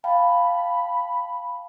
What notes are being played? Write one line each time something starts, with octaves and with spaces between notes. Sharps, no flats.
F5 G5 A5 B5